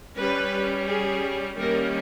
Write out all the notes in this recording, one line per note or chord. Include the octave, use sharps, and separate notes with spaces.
G3 C#4 B4
G#4
D#3 G3 A#3 C#4 A#4